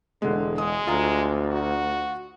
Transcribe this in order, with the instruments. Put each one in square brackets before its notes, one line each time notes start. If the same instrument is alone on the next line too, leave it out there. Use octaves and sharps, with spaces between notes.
[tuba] E1 [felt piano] D3 G#3
[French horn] G#3 [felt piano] D#6
[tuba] D2 [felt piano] F4 F5 A#5
[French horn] F#4